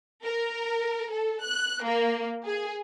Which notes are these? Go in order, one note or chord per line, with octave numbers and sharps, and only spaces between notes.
A#4
A4
F#6
A#3
G#4